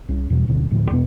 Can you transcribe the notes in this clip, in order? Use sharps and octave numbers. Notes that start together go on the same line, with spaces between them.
C2 C#4
E2 B2 G3
D1 B2 D3 C#4
D1 A2 D3 F3
E2 B2 B3